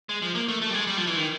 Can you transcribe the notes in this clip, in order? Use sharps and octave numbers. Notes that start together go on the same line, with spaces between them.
G#3
F3
A#3
A3
A3
G3
G#3
G3
F3
E3
D#3